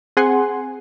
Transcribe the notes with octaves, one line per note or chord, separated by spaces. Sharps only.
C4 G#4 F#5 G#5 C6